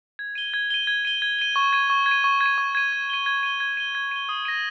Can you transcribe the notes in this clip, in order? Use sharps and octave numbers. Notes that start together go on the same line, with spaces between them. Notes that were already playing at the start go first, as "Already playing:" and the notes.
G#6
D#7 G7
G#6
D#7 G7
G#6
D#7 G7
G#6
D#7 G7
C#6
G#6 D#7
C#6
G#6
D#7
C#6
G#6
D#7
C#6
G#6 D#7
G#6
D#7 G7
G#6
D#7 G7
G#6
D#7 G7
G#6
D#7 G7
D#6
A#6 D#7